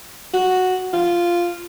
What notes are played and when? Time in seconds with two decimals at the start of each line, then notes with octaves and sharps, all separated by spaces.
0.34 F#4
0.93 F4